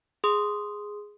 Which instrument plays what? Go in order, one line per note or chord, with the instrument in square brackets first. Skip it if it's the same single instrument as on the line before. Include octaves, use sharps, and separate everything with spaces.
[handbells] G#4 C6 D#6